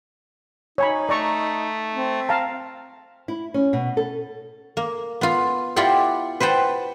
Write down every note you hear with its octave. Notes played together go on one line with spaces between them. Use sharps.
D#4 C#5 G#5 B5
A3 D5 A#5 C#6
C4
F5 A5 A#5
E4
C#4
B2
A4
A#3
B3 F4
E4 F4 G4 D5 F#5 G5
B4 C5 F#5 G5 A5